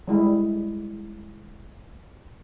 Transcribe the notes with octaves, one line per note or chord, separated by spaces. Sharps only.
G3 G#3 E4